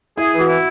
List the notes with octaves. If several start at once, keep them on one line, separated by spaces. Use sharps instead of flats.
E4 G#4
E3
F#4
E4